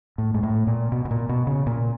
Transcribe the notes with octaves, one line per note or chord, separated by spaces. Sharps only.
A2
G#2
A2
A#2
B2
B2
A#2
B2
C#3
A#2